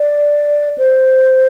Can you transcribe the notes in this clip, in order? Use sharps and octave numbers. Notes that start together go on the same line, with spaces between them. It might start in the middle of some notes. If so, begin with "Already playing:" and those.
Already playing: D5
C5